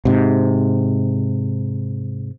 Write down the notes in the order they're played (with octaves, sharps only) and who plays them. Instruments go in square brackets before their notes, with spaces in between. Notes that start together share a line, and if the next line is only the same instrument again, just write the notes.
[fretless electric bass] G#2 C3